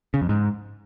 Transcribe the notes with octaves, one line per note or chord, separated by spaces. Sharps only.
C#3
F2
G#2